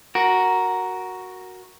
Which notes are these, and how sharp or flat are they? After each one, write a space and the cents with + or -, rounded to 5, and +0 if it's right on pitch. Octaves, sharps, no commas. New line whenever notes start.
F#4 +0 A#4 +5